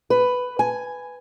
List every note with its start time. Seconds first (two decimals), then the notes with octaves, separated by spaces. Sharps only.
0.10 B4
0.59 G#5